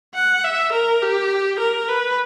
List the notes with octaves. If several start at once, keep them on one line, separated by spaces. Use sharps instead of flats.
F#5
E5
A#4
G4
A#4
B4